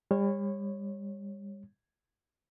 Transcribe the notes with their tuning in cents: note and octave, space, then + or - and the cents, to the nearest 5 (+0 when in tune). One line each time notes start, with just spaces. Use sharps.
G3 +35 C#5 -20